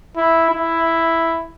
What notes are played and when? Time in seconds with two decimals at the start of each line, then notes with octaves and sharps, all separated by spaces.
0.17 E4
0.50 E4